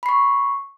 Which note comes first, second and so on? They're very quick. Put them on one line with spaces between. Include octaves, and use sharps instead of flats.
B5 C7 C#6